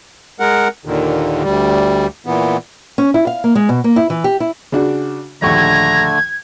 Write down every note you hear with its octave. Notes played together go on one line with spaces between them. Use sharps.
G#3 A#4 F#5
D#2 A#2 D3 D#3
D2 G3
A#2 E3 B3
C#4
E4
F5
A#3
G#3
B2
A#3
E4
E3
G4
E4
C#3 D4 F#4
A#1 D#2 D3 A3 A#5 C#6 G#6